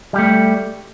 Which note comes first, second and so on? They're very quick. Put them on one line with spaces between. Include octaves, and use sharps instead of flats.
G3 G4 A3